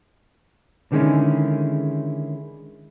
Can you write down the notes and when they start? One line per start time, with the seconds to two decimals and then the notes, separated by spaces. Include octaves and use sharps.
0.92 D3 D#3 G#3 C4 C#4 E4